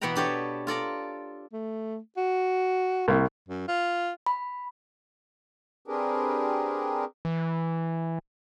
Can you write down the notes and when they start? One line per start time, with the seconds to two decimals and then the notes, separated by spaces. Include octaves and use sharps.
0.01 B2 E3 B3 F#5 G5 A#5
0.15 D4 G4 A4 C#5
0.67 F4 A4 D5 A#5
1.52 A3
2.17 F#4
3.08 C2 A#3
3.49 F#2
3.68 F4
4.26 B5
5.88 C4 D4 G4 G#4 A#4 B4
7.25 E3